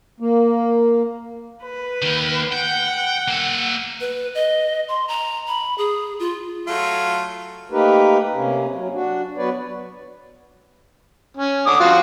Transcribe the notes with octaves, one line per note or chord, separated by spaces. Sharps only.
A#3
B4
D#3 A#3
F#5 G5
A#3 E5
B4
D#5
C6
A#5
B5
G#4
F4
F#3 A3 F4
A3 A#3 D#4 G4 A#4 B4
C3 A#3 C#4
F#3
D4 F#4
F#3 B3 B4 C#5 D5
C#4
D3 D6 D#6
F3 F4 F#4